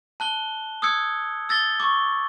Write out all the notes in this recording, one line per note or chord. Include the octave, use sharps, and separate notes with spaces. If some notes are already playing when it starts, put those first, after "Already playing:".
A5 F#6 G7
D#6 E6 F#6 G#6 C#7
E6 A6 A#6 G7
C#6 D6